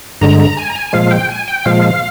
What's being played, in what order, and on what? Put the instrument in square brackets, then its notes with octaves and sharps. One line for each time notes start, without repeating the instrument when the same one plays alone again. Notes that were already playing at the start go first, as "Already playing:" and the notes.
[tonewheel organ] G2 D3 G#3 A#5
A#5
G#5
A#5
G#5
A#2 F3 G#3 F5
G5
G#5
G5
A#2 F3 G#3 F5